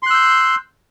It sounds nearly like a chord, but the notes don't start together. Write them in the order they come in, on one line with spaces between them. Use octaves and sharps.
C6 F#6 E6 G6